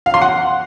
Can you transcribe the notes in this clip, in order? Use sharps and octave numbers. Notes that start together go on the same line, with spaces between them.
F5
C6
F#5